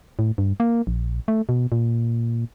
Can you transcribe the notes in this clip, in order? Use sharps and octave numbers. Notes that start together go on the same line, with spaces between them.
A2
G2
A#3
A#1
A3
B2
A#2